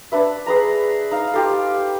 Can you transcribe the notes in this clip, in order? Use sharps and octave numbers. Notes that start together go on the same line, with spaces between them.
D4 B4 E5
G#4 B4 A#5
D#4 F5
F4 G4 A4